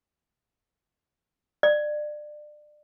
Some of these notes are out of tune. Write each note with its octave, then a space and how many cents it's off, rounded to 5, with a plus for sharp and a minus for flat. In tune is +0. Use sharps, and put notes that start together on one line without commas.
D5 +25